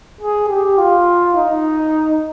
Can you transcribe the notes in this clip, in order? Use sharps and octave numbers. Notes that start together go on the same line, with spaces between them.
G#4
G4
F4
D#4